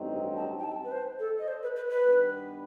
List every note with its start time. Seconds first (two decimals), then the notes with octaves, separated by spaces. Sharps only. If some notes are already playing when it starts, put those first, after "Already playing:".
Already playing: A1 G2 F#3 C4 D#4
0.36 A5
0.59 G5
0.64 A5
0.84 B4
0.92 C5
1.19 A4
1.39 D#5
1.48 C5
1.62 B4
1.76 B4
1.90 B4
2.04 G2 D#3 G3 B3